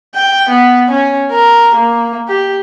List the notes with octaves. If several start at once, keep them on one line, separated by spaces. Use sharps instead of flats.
G5
B3
C#4
A#4
A#3
G4